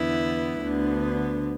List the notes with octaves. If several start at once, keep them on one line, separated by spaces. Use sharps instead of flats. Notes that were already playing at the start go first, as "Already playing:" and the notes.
Already playing: E2 D3 B3 E4
D2 D3 B3